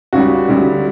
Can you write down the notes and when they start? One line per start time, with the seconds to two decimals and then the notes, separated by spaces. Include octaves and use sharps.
0.13 C#2 C#3 G3 F#4
0.48 D2 C#3 G3